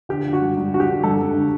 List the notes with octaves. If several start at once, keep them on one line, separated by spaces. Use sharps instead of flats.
D3 G4
D3
F#4
G2
G2
D3 F#4
G4
D3
G2 A4
G2
D3